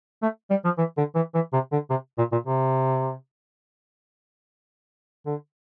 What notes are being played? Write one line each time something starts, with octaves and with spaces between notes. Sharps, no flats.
A3
G3
F3
E3
D3
E3
E3
C3
D3
C3
A#2
A#2
C3
D3